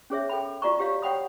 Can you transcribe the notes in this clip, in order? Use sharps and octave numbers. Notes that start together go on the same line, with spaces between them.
C#4 G#4 C#5 E5
A4 G5 B5
F4 F#4 D5 A#5 C#6
F4 G4 C#5 F5
C#5 F#5 G5 B5 D#6